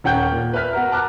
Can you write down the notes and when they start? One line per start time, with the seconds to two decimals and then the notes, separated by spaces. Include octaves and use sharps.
0.04 D#1 C#4 F#5 G5 G6
0.32 A#2
0.53 B4 E5 F6 B6
0.73 B3 F#4 A#4
0.92 A5 A#5 D6 F6 F#6